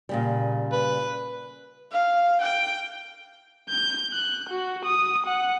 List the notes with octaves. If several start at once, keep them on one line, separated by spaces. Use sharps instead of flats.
A#2 C#3 G3
B4
F5
G5
G6
F#6
F#4
D#6
F#5